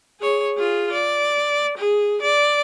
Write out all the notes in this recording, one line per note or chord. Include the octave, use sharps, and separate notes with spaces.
G#4 C#5
F4 G#4
D5
G#4
D5